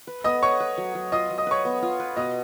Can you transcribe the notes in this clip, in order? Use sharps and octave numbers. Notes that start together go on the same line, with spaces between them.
B4
B3 D#5 D#6
B4 C#5 C#6
B4
F#3
F#3
F4 D#5 D#6
F#3
D#5 D#6
B4 C#5 C#6
B3
F4
B4
B2 D#5 D#6